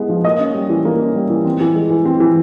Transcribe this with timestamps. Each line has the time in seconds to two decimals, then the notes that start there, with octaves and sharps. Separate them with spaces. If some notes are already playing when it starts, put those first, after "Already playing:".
Already playing: G#3 B3 E4
0.09 F3
0.24 A#3 D#5 D#6
0.40 C#4
0.54 G3
0.69 E3
0.85 A#3
0.99 C#4
1.15 G3
1.30 E3
1.45 C4
1.61 E3
1.76 G#3
1.90 E3
2.05 C4
2.20 E3